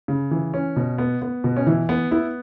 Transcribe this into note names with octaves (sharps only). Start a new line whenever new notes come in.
C#3
E3
C#4
B2
B3
B3
B2
C#4
E3 E4
B3
B3 E4